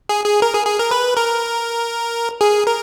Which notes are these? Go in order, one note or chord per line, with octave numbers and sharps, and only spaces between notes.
G#4
G#4
A#4
G#4
G#4
A#4
B4
A#4
G#4
A#4